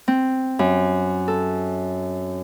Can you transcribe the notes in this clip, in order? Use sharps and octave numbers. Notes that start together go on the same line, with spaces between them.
C4
F#2
A4